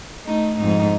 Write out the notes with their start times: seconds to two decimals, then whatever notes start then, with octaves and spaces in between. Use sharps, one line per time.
0.25 A3 D#4
0.58 F2 G#2 D#4